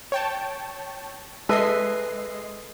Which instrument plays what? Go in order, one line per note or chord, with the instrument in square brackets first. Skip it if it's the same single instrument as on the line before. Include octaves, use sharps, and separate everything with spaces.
[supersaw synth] C#5 G5 A5
[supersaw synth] G#3 D#5 C7 [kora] A4 B4 E5